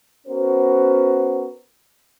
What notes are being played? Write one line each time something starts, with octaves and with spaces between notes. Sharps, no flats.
B3 C#4 F#4 A#4 C5